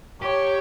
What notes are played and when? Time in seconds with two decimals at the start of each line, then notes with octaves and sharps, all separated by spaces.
0.22 G4 C#5